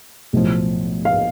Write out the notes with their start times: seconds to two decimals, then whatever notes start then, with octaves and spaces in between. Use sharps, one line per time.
0.33 B1 A2 F3
1.05 F5